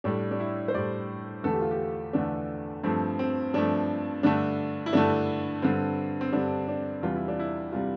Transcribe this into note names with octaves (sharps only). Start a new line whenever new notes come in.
A2 G3 D4
D4
E4
C5
A2 G3 D5
E2 D3 A3 A4
G4
F4
G4
E2 D3 A3 D4
G2 F3 A3 C4
C4
G2 F3 A3 D4
G2 D3 A3 D4
E4
G2 D3 A3 D4
G2 D3 G3 C4
C4
G2 D3 G3 D4
D4
E2 C3 G3 F4
E4
D4
E4
C3 G3 F4